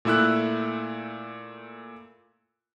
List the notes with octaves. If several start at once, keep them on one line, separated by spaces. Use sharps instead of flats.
A#2 A3 E4 E6 F#6